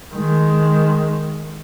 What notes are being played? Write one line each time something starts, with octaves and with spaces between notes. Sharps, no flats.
D#3 G#3